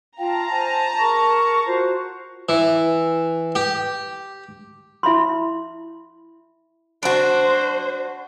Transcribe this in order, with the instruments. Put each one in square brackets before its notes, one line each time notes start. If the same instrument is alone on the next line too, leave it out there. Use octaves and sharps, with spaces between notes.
[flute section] F4 F5 G5 [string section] A5 A#5
[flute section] C5 G#5
G#4 A#4 C#6
F4 F#4 C5
[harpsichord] E3
G4
[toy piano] E4 E5 B5 C6
[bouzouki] D4 F#4 [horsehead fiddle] C5